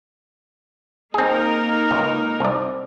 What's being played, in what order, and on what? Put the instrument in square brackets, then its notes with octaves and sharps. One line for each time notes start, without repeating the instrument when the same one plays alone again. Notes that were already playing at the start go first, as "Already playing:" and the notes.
[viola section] A#3 D#4 A#4 [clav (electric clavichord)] C4 G#4
[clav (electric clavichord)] C#2
C2 D5